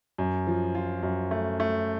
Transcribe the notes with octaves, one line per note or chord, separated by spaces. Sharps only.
F#2
F3
F4
F#2
A3
A3